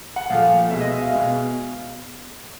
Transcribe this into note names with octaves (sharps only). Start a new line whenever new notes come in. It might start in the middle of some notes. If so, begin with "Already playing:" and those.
F#5
A#2 F3 A3 F5
B2 G#3 E5
D#5
E5
F5
B2 G#3